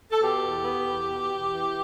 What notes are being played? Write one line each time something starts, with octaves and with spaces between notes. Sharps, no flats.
A4
B2 G4
E2
B3
E2
B2
E2
E3